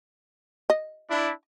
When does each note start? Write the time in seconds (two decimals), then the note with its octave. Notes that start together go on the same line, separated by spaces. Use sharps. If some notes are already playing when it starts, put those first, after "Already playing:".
0.70 D#5
1.10 D4 E4